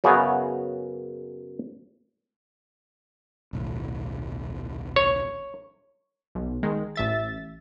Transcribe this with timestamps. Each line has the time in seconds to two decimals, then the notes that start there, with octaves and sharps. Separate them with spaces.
0.04 F#2 C#3 B3 F#4 G#4 C#5
3.53 D#1 B1 A2
4.96 C#5
6.35 B1
6.63 D#3 G#3
6.96 A1 E5 A6